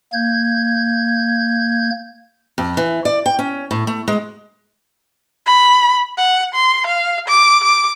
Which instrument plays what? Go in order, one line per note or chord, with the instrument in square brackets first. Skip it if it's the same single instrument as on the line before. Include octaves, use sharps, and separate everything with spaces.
[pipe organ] A#3 G6 G#6
[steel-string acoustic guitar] F2
E3
D5
G5
C#4
A2
A3
G#3
[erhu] B5
F#5
C6
F5
D6
D6